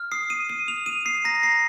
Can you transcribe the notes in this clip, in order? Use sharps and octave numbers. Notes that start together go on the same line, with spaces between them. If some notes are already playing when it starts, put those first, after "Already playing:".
Already playing: F6
D#6 C7
D#6 D#7
D#6 D#7
D#6 F7
D#6 D#7
D#6 C7
A#5 A#6
A#5 C7